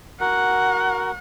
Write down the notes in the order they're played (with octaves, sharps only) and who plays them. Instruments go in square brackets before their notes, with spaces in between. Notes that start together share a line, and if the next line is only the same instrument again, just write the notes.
[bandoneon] F#4 A#4 [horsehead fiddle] F#5